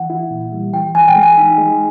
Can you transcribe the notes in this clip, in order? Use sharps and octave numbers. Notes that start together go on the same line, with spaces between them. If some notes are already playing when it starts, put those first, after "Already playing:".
Already playing: E3 F#5
E4
A#2
G3
E3 G5
E3 G#5
G5
G#3
G#5
D#4
G#3